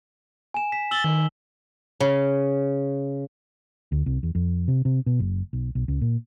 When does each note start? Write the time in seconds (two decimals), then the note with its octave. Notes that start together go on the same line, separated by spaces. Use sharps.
0.54 G#5 E7
0.72 B6 E7
0.91 E6 A6 F#7 G7
1.04 D#3
2.00 C#3
3.92 D2
4.06 C2
4.23 E2
4.35 F2
4.68 C3
4.85 C3
5.06 B2
5.19 F#1
5.53 B1
5.75 B1
5.88 C#2
6.01 A#2